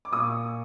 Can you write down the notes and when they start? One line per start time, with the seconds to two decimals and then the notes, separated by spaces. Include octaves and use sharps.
0.05 D6
0.12 A#2 C#6 D#6